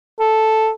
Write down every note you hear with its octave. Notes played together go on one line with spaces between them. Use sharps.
A4